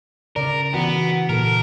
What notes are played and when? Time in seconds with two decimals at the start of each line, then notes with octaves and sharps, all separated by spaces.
0.36 C#3 A#4 D5
0.74 E3 B3 F#4
1.29 A#2 A4 A#4